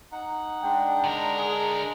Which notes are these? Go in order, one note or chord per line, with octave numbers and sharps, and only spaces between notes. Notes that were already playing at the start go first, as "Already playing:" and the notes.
D#4 F#5
G#3 D4 G5
D3 A#4
G#4